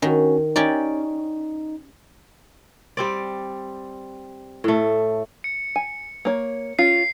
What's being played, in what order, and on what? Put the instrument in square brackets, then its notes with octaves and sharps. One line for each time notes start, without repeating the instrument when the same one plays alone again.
[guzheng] D#3 [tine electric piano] C#4 F#4
[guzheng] C#4 G4 D5 [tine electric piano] D#4
[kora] G3 C4 D5
A2 A3
[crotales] C#7
[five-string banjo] G#5
A#3 C#5
[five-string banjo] C#4 F4 [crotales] C7